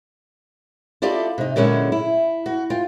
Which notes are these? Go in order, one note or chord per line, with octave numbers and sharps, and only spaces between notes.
E4 F4 G4 A4 D5 D#5
C3 D#4
A#2 D3 F#3 G#3 C#4 E4
E4
F#4
F4 G5